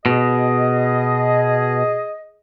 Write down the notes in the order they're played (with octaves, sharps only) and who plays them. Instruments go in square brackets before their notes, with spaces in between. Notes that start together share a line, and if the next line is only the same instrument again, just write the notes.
[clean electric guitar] B2 [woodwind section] G#4 D#5